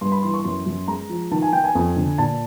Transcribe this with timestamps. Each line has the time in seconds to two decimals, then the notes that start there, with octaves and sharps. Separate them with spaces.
0.01 G2 C6
0.12 B5
0.23 E3 C6
0.34 C#6
0.44 F#2 C6
0.66 F#2
0.88 G#3 A#5
1.09 F3
1.31 D#3 A5
1.42 G#5
1.53 D#3 G5
1.64 G#5
1.75 F2
1.96 D3
2.18 A#2 A5